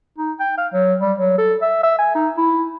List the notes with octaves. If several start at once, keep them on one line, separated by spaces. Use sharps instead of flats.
D#4
G5
F5
F#3
G3
F#3
A4
E5
E5
G#5
D#4
E4